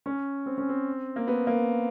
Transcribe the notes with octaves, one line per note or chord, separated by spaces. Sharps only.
C#4
C4
C#4
C4
A#3
B3
A#3